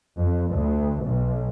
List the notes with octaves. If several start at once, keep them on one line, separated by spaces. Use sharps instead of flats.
F2
D2
B1